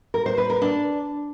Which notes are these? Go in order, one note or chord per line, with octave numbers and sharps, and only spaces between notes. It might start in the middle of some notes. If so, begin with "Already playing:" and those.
A#4
C5
B4
A#4
D4